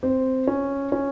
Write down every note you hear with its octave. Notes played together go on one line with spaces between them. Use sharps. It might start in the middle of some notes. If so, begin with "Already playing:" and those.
C4
C#4
C#4